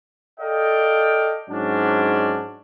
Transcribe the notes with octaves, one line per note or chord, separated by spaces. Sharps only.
A4 D5 D#5 F5 G5
G#2 F#3 C#4 D4